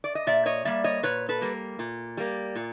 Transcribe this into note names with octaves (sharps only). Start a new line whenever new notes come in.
D5
D#5
A#2 D5 E5
C#5 D#5
G3 A#3 D5 E5
C#5 D#5
A#2 B4 C#5
A4 B4
G3 A#3
A#2
G3 A#3
A#2